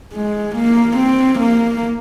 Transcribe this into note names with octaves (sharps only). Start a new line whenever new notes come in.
G#3
A#3
C4
A#3